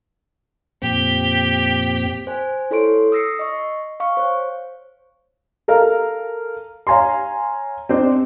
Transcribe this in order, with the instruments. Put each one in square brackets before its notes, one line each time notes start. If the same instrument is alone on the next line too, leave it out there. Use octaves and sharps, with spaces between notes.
[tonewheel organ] F2 A#2 C4 [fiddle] G4
[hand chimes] C5 G#5
E4 A4 C#5 C6 D7
D#6 E6 A#6 C7 C#7
D#5 C#6
F5 C#6
C5 C#5
[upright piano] A4 A#4 F5
C#5 F5 G#5 A#5 C6
C4 D4 C5 D#5